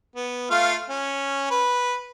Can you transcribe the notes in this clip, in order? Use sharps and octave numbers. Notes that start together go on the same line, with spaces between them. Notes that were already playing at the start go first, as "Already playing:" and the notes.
B3
A3 F4 F5
C#4
B4